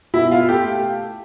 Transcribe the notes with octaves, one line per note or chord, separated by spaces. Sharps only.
B2 E4 E5
F4 F5
A3 G4 G5